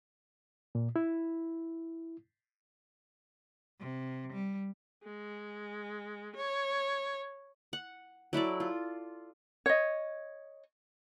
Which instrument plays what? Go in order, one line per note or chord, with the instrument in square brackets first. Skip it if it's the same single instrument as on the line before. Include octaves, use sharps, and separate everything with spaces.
[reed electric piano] A#2
E4
[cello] C3
G3
[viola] G#3
C#5
[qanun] F#5
F#3 E4 A4 D5
F4
[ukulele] C#5 D#5